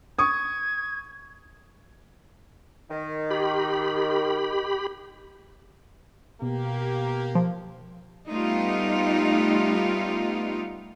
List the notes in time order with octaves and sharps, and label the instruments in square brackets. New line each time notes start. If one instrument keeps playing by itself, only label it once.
[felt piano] C#6 D#6 [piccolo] G#6
[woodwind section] D#3
[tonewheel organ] G4 B5
[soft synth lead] B2 [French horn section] A#3 G4
[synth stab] F3
[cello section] G3 A3 B3 D#4 F4 G4